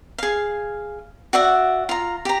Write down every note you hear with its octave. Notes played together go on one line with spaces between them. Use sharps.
G#4 F5
F#4 D5 E5 F#5
F4 A#5
G4 A#5